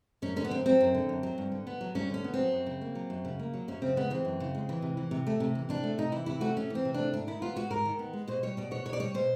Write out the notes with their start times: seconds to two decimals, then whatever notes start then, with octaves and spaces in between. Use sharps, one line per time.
0.22 F#2 C#4
0.36 D3 C#4
0.45 B3
0.51 F#2 C4
0.66 F#3 C4
0.81 F#2
0.94 D3
1.09 F#2
1.23 F#3
1.38 G2
1.52 D3
1.67 B3
1.81 F#3
1.95 G2 C#4
2.10 D3 C#4
2.24 B3
2.34 C4
2.39 F#3
2.52 F#2
2.66 C#3
2.81 A#3
2.95 F#3
3.10 F#2
3.25 C#3
3.39 A#3
3.54 F#3
3.68 F#2 C#4
3.82 C#3 C4
3.96 G#3 B3
4.10 E3 C4
4.25 F#2
4.40 C#3
4.54 G#3
4.69 E3
4.82 C3
4.97 E3
5.11 C3
5.27 A3
5.40 C3
5.55 E3
5.69 C3 D4
5.83 A3
5.98 C3 D#4
6.12 E3 E4
6.26 C3 E4
6.41 A3 F#4
6.56 C3 C#4
6.70 E3 C4
6.85 C3
6.94 A3 D4
7.12 G#2 D4
7.27 D#3 E4
7.42 B3 F4
7.56 G#3 F#4
7.70 G#2 A#4
7.85 D#3
7.99 B3
8.13 G#3
8.28 B2 C5
8.43 G3 C#5
8.57 B2 D5
8.71 B3 C#5
8.85 B2 C#5
8.93 D5
9.00 G3 C#5
9.14 B2 C5